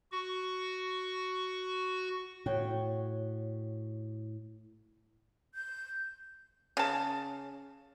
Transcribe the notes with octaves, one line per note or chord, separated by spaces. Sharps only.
F#4 C#6
A2 F#4 C#5 G5
G6
C#3 A5